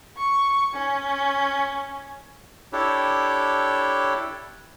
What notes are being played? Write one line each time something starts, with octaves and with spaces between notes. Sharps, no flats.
C#6
C#4
D4 E4 G4 A4 C#5